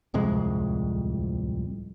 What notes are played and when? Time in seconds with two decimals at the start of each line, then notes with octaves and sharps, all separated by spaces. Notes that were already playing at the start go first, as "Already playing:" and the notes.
0.14 D1 C2 F2 G#3